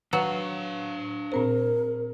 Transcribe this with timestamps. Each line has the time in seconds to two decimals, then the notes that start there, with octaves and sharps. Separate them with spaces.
0.13 F#3 D4 B4 F5
1.32 A#2 C4 A#4 C5